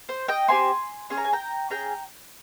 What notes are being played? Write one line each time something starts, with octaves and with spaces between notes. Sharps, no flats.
C5
D#5 G5
C4 G4 G#5 C6
C#4 G#4 C6
A#5
G#5
G5 A#5
C#4 G#4 G5 A#5